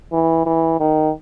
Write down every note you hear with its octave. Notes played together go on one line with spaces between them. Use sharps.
E3
E3
D#3